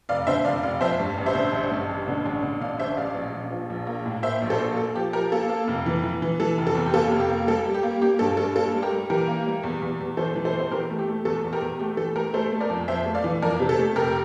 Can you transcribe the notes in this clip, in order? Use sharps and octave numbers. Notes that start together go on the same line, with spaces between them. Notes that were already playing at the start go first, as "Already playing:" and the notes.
F1 D5 F5
D3 C5 E5
F1 D5 F5
F1 D5 F5
F2 C5 E5
G2
A1
C5 E5
D3
A1
G2
A1
D3
A1
D3
D3 D5 F5
A1 C5 E5
A1 D5 F5
A#1
A#1
F3
A#1
A#3
A2
A#3 C5 E5
A#1
A4 C5
A#3
A#3 A4
F3 G4
F3 G4 A#4
A#3 A4
A#3
F1
E3
E3
E3
E3 A4
F1
A4
E2
G4
A#3 A4
F1
G4
A#3
G3 A4
G3
G4
A#3
A#3 G4
G2 A4
G2 A4
A#3 A4
G3
G4 A#4
G3
E3 G4 A#4
A#3
G3
E2
E2
E2
E3 A4 C5
E3
A4 C5
E2
C5
E3 G4 A#4
A3
G4
A3
E2 A4
E2
G4 A#4
E2
A3 G4
E3 A4
A3 G4 A#4
A3 A4 C5
A3
A#4 D5
F2
F2 C5 E5
A3
D5 F5
E3
F2 A#4 D5
C3
A4
A3
F1 G4 A#4